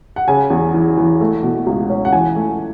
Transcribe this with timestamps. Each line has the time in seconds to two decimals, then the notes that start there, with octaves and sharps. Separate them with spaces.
0.16 F#5
0.28 C#3 G#5
0.50 E2
0.74 E3
0.97 E3
1.21 A3
1.43 B2
1.66 C#2
1.90 C#4
2.05 F#5
2.12 E3 G#5
2.36 A3